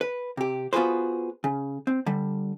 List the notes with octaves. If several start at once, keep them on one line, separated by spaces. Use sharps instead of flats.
B4
C3 G4
B3 F4 F#4 G#4 B4 C5
C#3
C4
D3 G3